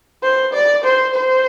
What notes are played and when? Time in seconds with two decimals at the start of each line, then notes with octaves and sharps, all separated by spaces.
0.23 C5
0.53 D5
0.84 C5
1.15 C5